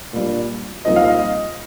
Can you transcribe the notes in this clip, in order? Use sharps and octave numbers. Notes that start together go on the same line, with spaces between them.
A#2 G3 D4
C2 A#2 F3 C4 D#4 D#5
F5
D#5